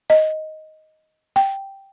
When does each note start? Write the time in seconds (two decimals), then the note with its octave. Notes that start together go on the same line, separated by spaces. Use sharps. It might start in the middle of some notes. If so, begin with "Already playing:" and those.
0.10 D#5
1.36 G5